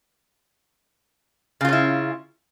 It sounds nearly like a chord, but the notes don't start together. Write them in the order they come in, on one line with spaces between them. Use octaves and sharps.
C#3 F4 C#4 E4